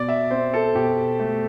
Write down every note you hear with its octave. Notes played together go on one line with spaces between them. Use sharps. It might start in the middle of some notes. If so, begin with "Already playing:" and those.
Already playing: B2 D5
E5
C4 C5
A4
B2 G4
A3